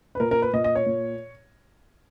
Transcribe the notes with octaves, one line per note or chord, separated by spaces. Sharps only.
B4
A#2 A#4
A#4
B4
A#2 D#5
D#5
C#5
A#2